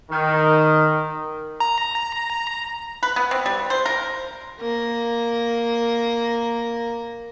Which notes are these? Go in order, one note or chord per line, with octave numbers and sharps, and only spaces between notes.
D#3
A#5
B4
B3
C4
G3
C5
A#4
A#3 A#4